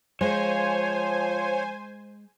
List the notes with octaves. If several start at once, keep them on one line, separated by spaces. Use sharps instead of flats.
F3 G#3 C5 C#5 G#5